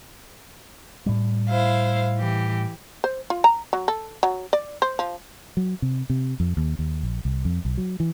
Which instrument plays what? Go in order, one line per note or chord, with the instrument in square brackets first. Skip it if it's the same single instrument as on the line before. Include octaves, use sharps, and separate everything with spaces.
[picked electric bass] A2 G3
[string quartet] E4 C5 F5
E3 G4
[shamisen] C5
F4
A#5
F#3
A4
F#3
D5
C5
F3
[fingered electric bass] F#3
C3
C3
F2
D#2
D#2
A#1
C2
F2
B1
F#3
E3